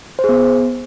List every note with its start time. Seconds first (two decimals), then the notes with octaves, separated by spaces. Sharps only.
0.19 C5
0.24 G#4
0.29 B3